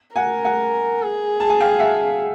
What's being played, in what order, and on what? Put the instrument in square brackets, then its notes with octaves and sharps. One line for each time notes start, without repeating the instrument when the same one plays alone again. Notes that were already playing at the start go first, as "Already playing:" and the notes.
[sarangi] A#4 [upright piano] F#5 G#5
[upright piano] F#5 G#5
[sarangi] G#4
[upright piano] A5
G#5
F5 G5
E5 F#5